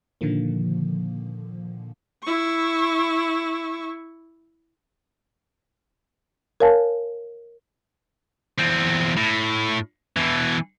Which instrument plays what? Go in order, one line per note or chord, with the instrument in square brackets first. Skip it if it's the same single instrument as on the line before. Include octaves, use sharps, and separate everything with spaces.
[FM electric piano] A#2 D3 D#3 F3 A#3
[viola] E4 C#6
[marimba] A#4 C#5 F5 G#5 A5
[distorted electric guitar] E2 C4
A2
B2 E3